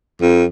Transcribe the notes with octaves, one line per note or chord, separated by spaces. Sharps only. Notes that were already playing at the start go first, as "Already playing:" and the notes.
F2